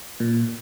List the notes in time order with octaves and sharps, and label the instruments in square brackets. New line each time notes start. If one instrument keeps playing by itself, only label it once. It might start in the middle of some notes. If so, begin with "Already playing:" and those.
[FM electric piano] A#2